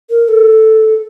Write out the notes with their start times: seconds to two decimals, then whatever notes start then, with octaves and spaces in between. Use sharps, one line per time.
0.10 A#4
0.28 A4